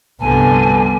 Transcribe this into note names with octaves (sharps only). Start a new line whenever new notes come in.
C2 G2 D3 F3 B3 G#5 A5